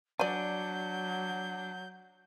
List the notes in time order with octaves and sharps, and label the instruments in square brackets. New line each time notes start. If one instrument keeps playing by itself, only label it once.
[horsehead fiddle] F#3 [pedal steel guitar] D4 [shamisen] D5 G#5 [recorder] G6